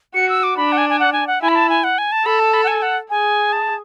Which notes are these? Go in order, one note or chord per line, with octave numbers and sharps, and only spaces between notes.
F#4 C#7
E6
D6
D4 B5
F#5
G#5
G#5
F#5
G#5
F#5
E4 G#5
B5
A5
G#5
F#5
G#5
A5
A4 B5
A5
B5
F#5
G#5
F#5
G#4 G#5
A5